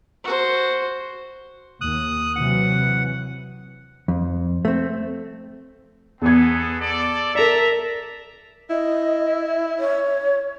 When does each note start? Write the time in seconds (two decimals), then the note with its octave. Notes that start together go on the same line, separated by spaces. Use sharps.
0.24 F#4 C5
1.81 D#2 D#6 F#6
2.36 C3 E3 F#3 F#5
4.08 F2
4.65 A3 C4
6.22 E2 B3 G#4 A4 G#6
6.80 A4 D5
7.35 A#4 D5 E5 A5 A#5
8.70 E4 D#5
9.79 C#5